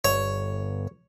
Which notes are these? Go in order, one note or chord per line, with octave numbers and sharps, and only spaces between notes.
G1 C#5